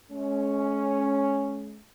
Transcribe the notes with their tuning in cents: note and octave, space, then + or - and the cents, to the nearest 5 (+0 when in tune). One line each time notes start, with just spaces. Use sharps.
G#3 +40 C#4 +0